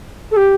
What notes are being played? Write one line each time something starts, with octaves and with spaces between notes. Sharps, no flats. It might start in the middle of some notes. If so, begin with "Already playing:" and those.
A4
G4